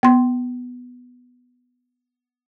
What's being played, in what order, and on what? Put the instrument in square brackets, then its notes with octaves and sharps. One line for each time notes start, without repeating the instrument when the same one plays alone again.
[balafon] B3 C6